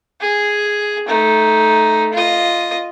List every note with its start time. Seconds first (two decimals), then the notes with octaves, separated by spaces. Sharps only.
0.21 G#4
1.07 A3 D#4
2.13 F4 D#5